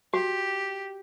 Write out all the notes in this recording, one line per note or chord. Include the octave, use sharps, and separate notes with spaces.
F#4 G4